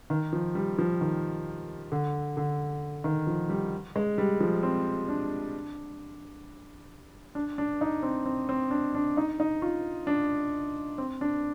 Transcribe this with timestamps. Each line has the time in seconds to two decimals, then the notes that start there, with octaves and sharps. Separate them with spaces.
0.10 D#3
0.33 F3
0.55 G3
0.78 F3
1.01 D#3
1.92 D3
2.37 D3
3.04 D#3
3.27 F3
3.49 G3
3.96 G#3
4.18 G3
4.40 F3
4.63 C4
5.09 D4
7.35 D4
7.58 D4
7.81 D#4
8.03 C4
8.26 C4
8.49 C4
8.71 D4
8.95 D4
9.17 D#4
9.40 D#4
9.62 F4
10.07 D4
10.98 C4
11.21 D4